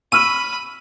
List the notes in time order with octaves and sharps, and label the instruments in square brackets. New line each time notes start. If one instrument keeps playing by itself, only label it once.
[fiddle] B5 [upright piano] C#6 E6 F6 [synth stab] D#7